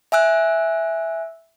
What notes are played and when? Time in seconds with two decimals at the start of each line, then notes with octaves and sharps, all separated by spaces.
0.12 E5 G#5 E6 F#6